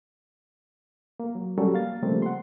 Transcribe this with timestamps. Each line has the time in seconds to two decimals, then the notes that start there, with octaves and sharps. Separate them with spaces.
1.20 A#3
1.35 F#3
1.58 F#3 G3 C#4 A4 A#4 C#5
1.74 A#3 F5 A6
2.03 C#3 F3 G3 A3 A#3 C4
2.22 F#5 C6